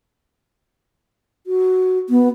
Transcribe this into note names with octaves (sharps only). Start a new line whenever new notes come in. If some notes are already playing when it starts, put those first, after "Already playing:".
F#4
B3